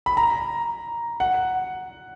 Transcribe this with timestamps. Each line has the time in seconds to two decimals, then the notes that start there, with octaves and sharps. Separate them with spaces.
0.06 B5
0.17 A#5
1.20 F#5